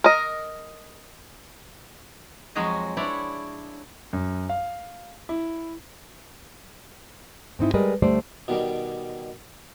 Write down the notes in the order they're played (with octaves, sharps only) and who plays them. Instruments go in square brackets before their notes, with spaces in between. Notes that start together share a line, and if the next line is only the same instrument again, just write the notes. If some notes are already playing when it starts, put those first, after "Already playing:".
[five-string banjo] A#4 D#5
[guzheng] F2 F#3 G#3 F#4 G#4 D#5
D4 E4 C#5 D5 B5
[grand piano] F#2
F5
E4
[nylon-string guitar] G#2 C4 D#4 E4
G3 G#3 A#4 B4 D5 D#5
D2 G3 A3 C5 D5
[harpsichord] B2 D#3 G3